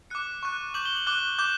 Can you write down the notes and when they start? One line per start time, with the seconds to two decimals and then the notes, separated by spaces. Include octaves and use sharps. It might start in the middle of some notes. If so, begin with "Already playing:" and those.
0.10 D6 F#6 C#7
0.43 C#6 F#6
0.74 D6 G6 F#7
0.86 G7
0.96 F#7
1.07 D6 F#6 G7
1.39 D6 G6